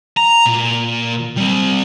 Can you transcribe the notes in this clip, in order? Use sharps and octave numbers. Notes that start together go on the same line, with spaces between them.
A#5
A#2
G3 C4